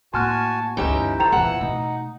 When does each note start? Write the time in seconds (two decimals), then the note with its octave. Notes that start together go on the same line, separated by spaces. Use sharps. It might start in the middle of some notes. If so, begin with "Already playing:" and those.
0.14 A2 A#3 F#4 G#5 A5 C6 F6 F#6
0.77 D2 G2 E3 C#4 D#4 G4 E5
1.19 D#3 A4 C5 G5 A#5 F7
1.32 E2 A#2 E3 F#5 E6
1.61 B2 A3 D#4